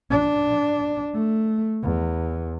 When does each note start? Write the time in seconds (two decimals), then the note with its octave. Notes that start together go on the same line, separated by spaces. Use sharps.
0.10 D4
1.14 A3
1.82 E2